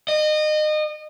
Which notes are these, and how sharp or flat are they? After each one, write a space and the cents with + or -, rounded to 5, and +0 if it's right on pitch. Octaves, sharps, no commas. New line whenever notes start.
D#5 -30